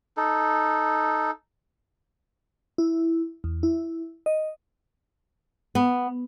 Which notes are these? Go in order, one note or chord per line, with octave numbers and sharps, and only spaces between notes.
D#4 A4
E4
E2
E4
D#5
B3